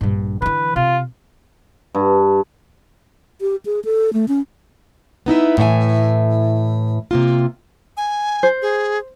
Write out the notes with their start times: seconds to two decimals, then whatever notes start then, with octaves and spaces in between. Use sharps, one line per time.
0.01 A#1 G2
0.42 D3 E3 B4
0.76 C3 F4
1.95 G2
3.41 G4
3.66 G#4
3.85 A4
4.13 A3
4.28 C#4
5.26 B3 D#4 E4 E5
5.58 A2 E3 E5 F#5 G#5
7.11 C3 A#3 F4
7.97 G#5
8.43 C5
8.62 G#4